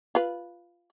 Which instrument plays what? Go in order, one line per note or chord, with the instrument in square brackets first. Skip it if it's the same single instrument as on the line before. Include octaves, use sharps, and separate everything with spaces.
[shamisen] F4 B4